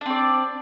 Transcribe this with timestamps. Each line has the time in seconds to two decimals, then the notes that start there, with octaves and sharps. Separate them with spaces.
0.01 D4
0.06 C4
0.10 D5